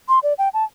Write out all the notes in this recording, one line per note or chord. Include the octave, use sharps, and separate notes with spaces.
C6
D5
G5
A5